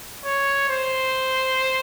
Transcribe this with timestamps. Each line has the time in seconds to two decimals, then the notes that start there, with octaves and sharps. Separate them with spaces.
0.25 C#5
0.69 C5